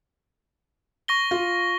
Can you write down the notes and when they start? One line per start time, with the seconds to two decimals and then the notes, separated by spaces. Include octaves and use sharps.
1.08 C#6 A#6 G7
1.31 F4